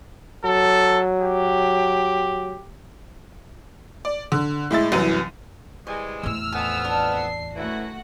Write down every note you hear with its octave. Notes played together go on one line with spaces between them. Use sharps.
F#3 A4
G4
D5
D3
A2 G#3 E5 A6
C2 F#2 E3 F#3 D#7
E3 G3 G#3 C5
E2 A2 E6 F6
F2 B3 G#5
D4
C7
F#2 E3 A3 E4 F#4 F#5